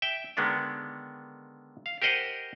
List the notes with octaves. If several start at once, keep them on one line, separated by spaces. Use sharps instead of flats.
E5 G5
D3 D#3 G#3 B3 D4
F5
G4 A#4 C5 D#5 F#5